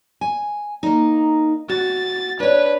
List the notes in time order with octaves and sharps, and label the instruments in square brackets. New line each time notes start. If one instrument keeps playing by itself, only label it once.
[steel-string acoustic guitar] G#5
A#3 D#4
[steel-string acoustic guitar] F#4 [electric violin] A6
[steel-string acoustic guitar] D4 C#5 [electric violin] B4